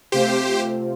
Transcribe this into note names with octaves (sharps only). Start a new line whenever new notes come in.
C3 A3 C4 F4 G4 C5